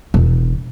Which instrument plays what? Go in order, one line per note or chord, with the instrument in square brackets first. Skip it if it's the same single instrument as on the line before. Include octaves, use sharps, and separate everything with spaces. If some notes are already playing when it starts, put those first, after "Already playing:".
[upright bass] E1